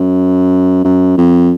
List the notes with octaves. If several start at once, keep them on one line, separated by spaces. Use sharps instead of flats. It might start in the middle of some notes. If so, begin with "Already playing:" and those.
Already playing: F#2
F#2
F2